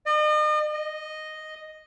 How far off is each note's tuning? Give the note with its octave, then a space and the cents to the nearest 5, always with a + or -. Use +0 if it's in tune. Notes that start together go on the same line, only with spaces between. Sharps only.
D#5 -40
D#5 -5